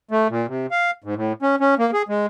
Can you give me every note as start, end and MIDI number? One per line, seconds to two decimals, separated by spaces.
0.11 0.28 57
0.30 0.46 46
0.48 0.66 48
0.71 0.91 77
1.04 1.15 44
1.16 1.33 45
1.42 1.56 61
1.60 1.75 61
1.79 1.91 58
1.93 2.02 68
2.09 2.26 56